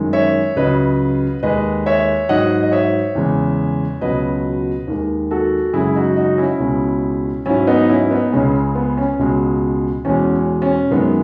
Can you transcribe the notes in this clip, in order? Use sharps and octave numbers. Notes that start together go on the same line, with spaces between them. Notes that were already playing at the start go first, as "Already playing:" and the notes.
Already playing: F#2 D#3 G#3
C#5 E5
C#2 C#3 F#3 B4 D#5
D#2 D#3 G#3 B4 D#5
C#5 E5
G#2 F#3 D#5 F#5
D#5
C#5 E5
E2 C#3 G#3
C#2 B2 F#3 B4 D#5
D#2 D#3 G#3
F#4 A4
F#2 C#3 G#3 E4 G#4
D#4 F#4
D#4 F#4
C#4 E4
C#2 B2 G#3
G#2 F#3 C#4 E4
B3 D#4
C#4 E4
B3 D#4
C#2 C#3 G#3 C#4
B3
C#4
C#2 B2 G#3
E2 B2 G#3 C#4
C#4
F#2 D#3 G#3 B3